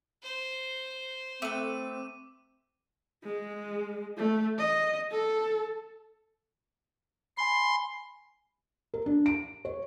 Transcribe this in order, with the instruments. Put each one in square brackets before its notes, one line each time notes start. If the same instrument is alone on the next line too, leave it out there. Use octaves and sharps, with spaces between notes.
[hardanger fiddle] C5
[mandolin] A3 B4 [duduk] C4 [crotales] D6 D#7
[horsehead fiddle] G#3
A3
D#5
A4
[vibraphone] G#5 B5 [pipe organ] C6
[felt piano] A#4
D4
D7
C#5